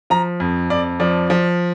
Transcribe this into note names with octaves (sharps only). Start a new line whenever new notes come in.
F3 A#5
F2
F2 D5
F3 D5
F3